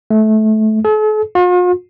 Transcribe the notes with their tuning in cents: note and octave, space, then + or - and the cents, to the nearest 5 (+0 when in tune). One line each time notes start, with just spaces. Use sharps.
A3 -20
A4 -45
F4 +45